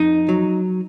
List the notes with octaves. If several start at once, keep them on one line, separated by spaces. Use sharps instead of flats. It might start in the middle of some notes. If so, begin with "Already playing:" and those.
Already playing: F2 D#4
F#3